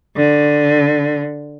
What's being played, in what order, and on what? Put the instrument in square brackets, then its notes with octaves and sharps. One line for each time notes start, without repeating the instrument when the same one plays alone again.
[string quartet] D3